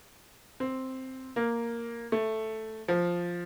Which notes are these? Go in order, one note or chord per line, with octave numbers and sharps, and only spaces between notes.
C4
A#3
A3
F3